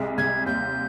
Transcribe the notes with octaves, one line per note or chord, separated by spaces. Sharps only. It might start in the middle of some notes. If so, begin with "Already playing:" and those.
Already playing: C2 G#3
C2 G#6
D#2 G6